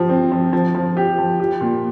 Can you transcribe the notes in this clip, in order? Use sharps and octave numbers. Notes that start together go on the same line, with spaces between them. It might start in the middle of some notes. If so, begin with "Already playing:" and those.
Already playing: F3 G4
C4
F3
F3
F3
G4
F3
G4
A#2